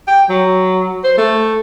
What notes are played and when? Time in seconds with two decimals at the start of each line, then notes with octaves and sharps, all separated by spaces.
0.08 G5
0.30 F#3
1.04 C5
1.18 A3